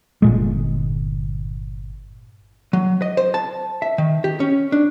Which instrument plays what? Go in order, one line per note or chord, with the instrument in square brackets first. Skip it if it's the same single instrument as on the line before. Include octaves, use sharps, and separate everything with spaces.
[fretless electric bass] G1 A#2 G#3
[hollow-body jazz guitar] F#3
D#5
C5
A5
E5
D#3
G4
C#4
D4